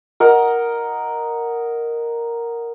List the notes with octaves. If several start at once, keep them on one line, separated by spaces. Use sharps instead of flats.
A#4 D#5 F#5